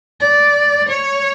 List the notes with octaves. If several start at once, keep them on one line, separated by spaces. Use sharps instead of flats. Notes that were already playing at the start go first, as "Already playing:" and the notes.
D5
C#5